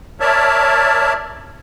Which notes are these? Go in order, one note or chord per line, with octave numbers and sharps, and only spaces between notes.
A#4 C#5 D5 E5 A5